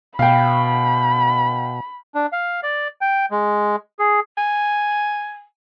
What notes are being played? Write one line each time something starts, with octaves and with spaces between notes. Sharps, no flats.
B2 F5 G5 B5
D4
F5
D5
G5
G#3
G#4
G#5